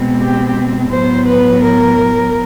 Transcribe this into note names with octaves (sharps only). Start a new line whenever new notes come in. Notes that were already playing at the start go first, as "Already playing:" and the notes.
Already playing: B2 G#3 C4
G4
A2 F#3 B3 C5
B4
A#4